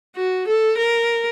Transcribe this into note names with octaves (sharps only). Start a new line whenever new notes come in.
F#4
A4
A#4